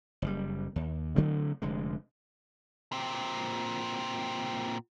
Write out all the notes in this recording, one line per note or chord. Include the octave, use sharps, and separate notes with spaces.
F#1 A2 G3
D#2
C#3 F#3 A3 C4
F1 D3 G#3
A#2 C4